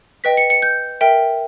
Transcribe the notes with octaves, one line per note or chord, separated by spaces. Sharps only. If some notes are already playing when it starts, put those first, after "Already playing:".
B4 D#5 G5 B6
C#7
C#7
G6
A#4 E5 G5